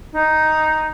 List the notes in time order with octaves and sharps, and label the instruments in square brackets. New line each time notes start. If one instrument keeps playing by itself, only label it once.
[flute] D#4